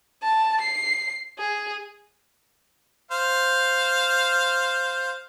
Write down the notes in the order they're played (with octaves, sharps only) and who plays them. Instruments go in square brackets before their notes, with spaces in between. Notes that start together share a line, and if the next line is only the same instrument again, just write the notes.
[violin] A5
C7
G#4
[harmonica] C5 F5